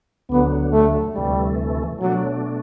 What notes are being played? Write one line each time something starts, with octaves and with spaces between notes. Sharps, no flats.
D2 D3 F#3 B3
A3
D2 C3 E3 G3 A3
B2 F#3 A3 D4